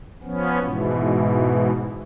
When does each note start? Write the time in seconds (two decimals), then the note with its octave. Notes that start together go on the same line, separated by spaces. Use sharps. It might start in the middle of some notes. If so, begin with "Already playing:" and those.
0.23 F3 B3 C#4
0.62 G#2 B2 E3